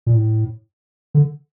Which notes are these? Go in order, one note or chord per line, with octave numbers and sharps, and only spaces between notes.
A#2
A2
D3